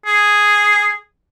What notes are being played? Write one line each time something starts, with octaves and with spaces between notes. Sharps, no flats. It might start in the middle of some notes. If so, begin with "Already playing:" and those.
G#4